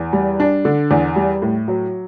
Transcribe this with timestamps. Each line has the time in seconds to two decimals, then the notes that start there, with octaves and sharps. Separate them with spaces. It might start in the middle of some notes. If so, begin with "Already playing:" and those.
Already playing: E2
0.13 G3
0.40 D4
0.65 D3
0.91 E2
1.16 G3
1.42 A2
1.68 F#3